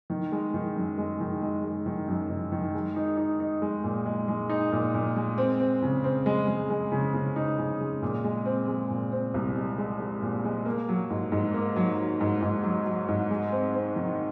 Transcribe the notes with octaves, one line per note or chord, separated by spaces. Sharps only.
D#3
G#3
D#3
F#2
G#3
D#3
G#3
G#3
D#3
F#2
D#3
D#3
G#3
D#4
D#4
D#4
G#3
A#2
G#3
G#3
D#4
A#2
A#2
G#3
C4
C4
C#3
C4
G#3
G#3
G#3
C#3
C#3
D#4
C#3
G#3
A#2
G#3
C4
G#3
A#2
C4
C2
G#3
G#3
G#3
A#2
G#3
A#3
F#3
G#2
G#2
A#3
F#3
F#3
G#2
G#2
F#3
F#3
G#2
G#3
C4
C4
D#3